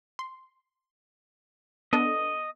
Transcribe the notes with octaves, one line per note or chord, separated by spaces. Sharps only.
C6
B3 D4 A4 D#5